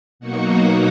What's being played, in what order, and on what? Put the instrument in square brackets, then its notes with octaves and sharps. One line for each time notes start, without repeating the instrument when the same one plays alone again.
[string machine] B2 F#3 A#3 D#4 F#4 F#5